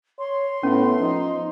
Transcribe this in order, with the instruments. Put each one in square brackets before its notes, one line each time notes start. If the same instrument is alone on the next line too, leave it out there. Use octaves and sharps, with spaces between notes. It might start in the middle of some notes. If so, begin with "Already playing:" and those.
[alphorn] C#5 [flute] C6
[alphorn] A2 [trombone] B3 [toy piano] C#4
[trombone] F3 [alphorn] D#4